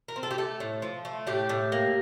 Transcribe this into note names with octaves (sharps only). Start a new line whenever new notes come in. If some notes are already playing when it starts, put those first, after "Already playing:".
A#4
C4
A4
G4
A3 A4
A2
F3
A3
A2 G4
A2
A#3